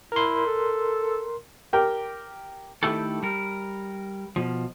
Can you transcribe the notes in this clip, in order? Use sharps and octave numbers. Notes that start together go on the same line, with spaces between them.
E4 A#4 C6
A4
G4 A#4 G5
D#3 A3 E4 G4 A4
G3 A#4
B2 F3